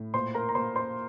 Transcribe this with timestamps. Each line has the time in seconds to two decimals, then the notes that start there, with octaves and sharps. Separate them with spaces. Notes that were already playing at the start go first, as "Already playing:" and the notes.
Already playing: A2
0.14 A#2 C5 C6
0.35 A#4 A#5
0.49 A#5
0.55 A#2 C5 C6
0.75 C5 C6